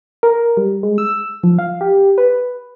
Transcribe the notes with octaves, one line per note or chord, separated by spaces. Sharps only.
A#4
G3
G#3
E6
F3
F5
G4
B4